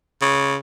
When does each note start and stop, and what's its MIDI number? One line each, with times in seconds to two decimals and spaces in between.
0.22 0.56 49